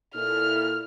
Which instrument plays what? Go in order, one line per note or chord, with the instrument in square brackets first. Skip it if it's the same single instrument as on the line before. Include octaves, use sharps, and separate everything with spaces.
[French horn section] A#2 E4 A4 [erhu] F6